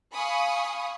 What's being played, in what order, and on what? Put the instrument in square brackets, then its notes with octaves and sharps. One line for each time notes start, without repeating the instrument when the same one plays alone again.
[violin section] F5 G#5 B5 C#6 D#6